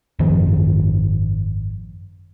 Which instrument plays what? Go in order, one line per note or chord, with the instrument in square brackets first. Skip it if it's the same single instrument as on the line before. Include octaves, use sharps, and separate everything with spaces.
[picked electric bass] G#1 F#2 D#3 F3